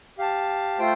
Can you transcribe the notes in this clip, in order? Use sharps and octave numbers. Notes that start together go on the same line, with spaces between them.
G4 F5 A5
A3 F4 C5 G5